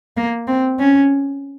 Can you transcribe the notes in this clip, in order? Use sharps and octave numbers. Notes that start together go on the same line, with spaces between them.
A#3
C4
C#4